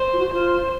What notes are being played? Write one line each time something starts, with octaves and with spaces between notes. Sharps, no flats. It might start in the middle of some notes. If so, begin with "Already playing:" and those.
Already playing: C5
F4
F#4
F4 C5